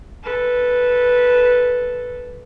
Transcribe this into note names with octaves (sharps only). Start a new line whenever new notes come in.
A4 B4